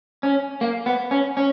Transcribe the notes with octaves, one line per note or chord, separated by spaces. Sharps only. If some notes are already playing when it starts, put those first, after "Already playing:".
C#4
A#3
B3
C#4
C#4